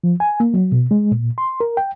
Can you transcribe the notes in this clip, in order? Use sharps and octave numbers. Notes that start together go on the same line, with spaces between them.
F3
G#5
A#3
F#3
B2
G#3
A#2
C6
A#4
G5